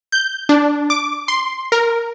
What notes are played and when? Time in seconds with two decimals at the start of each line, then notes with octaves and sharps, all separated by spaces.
0.12 G6
0.49 D4
0.90 D6
1.28 C6
1.72 A#4